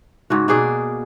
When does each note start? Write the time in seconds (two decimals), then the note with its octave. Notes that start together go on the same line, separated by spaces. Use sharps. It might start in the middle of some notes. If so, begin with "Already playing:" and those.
0.30 G#2 C#3 F#4
0.48 B2 A#3 G#4 D5